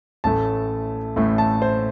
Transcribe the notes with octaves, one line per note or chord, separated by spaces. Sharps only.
A1 A2 A3 A5
A1 A2 A3
A5
C5